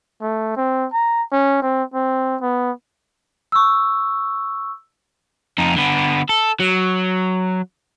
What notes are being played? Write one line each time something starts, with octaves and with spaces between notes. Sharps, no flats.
A3
C4
A#5
C#4
C4
C4
B3
C#6 E6
F2 D#4
D3 B3
A4
F#3